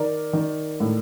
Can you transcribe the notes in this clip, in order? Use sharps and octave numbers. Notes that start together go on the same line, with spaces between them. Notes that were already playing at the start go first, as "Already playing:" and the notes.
Already playing: D#3 A#4 D5
D#3
A2